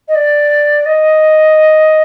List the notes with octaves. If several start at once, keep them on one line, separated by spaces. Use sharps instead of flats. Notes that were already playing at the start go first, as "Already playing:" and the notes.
D#5
D5
D#5